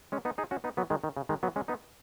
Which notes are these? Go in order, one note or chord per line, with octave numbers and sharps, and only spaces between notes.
G#3 C#4
B3 D#4
D#4 G#4
C#4 F#4
B3 D#4
F#3 B3
D#3 G#3
D#3
C#3
D#3 G#3
F#3 B3
G#3 C#4
B3 D#4